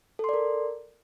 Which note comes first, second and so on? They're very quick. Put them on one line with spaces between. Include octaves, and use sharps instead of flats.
A4 C6 D5 A#4